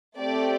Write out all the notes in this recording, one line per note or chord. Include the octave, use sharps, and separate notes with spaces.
A3 C4 G4 D5